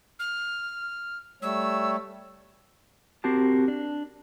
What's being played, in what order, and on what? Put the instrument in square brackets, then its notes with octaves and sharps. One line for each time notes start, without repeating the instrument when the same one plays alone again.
[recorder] F6
[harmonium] G3 A3 C#5 [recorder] E6
[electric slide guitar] C4 F#4 G4 A#4 A5
D4